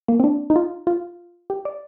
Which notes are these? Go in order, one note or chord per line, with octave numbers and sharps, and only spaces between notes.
A#3
C4
D4
D#4
F4
F4
G4
D5